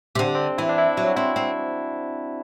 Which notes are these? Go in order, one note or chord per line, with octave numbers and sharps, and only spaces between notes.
C3
D3 C4
D4
C4
E3 E4
D4
E4
F#3
F#4
C4 E4
C4